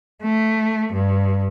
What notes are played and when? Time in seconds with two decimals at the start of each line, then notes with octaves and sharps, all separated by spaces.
0.23 A3
0.93 G2